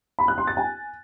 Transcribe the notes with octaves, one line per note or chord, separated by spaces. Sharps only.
B5
F#6
C6
A6
G#5